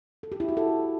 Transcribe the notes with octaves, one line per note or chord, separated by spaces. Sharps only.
A4
G4
E4
F#4
A4